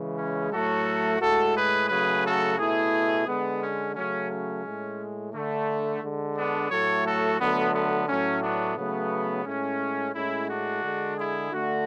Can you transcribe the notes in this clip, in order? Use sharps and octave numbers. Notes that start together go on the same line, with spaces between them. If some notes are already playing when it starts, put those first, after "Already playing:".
Already playing: C#3 E3 G#3
C#4
A2 F#3 A3 F#4 A4
A2 G#3 F#4 A4
G#4 B4
C#3 F#3 A3 G#4 B4
F#4 A4
B2 A3 E4 G#4
D3 G#3 B3
C#4
C#3 F#3 A3 C#4
C#4
A2 G#3
D3 A3
D3 G#3
B3 D4
A2 F#3 A3 A4 C#5
F#4 A4
D3 F#3 A3 B3
B3
A2 F#3 A3 C#4
B3 D4
C#3 F#3 A3 B3
A2 G#3 C#4
A2 G#3 C#4 E4
D4 F#4
D3 G#3
E4 G#4
D3 A3 D4 F#4